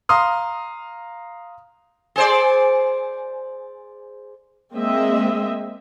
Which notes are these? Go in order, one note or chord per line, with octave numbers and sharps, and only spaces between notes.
F5 A#5 C6 D#6 F6
G#4 C5 D5
G#3 A#3 C4 D#5 E5